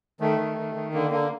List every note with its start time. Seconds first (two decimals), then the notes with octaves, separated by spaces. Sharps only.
0.20 D#3 A3
0.39 D#3
0.57 D#3
0.74 D#3
0.93 D3 A#3
1.11 D3 A#3